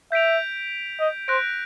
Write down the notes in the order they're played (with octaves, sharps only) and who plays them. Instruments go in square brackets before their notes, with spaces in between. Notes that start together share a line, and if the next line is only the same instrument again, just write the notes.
[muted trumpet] E5 [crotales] G6 B6 D7 F7
[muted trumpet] D#5
[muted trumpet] C5 [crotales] F#6 A#6 D7